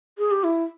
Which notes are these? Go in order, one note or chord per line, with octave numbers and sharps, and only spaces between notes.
G#4
G4
E4